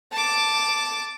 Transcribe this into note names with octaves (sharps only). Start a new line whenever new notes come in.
A5 D6